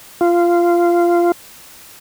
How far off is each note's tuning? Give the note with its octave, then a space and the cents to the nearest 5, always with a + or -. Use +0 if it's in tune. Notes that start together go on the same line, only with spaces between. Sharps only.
F4 -15